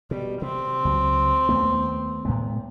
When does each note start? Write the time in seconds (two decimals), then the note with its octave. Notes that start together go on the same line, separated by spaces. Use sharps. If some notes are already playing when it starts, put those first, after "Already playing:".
0.11 B2 G3
0.42 C3 C4
0.85 C#2 F#3
1.49 D#2 A3 B3
2.25 A2 G#3 B3